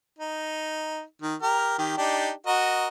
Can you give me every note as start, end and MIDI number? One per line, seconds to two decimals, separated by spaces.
0.18 1.02 63
1.22 1.35 51
1.42 1.76 67
1.42 1.76 70
1.42 1.76 89
1.78 1.92 51
1.78 1.92 67
1.97 2.30 62
1.97 2.30 63
1.97 2.30 67
2.46 2.88 66
2.46 2.88 70
2.46 2.88 75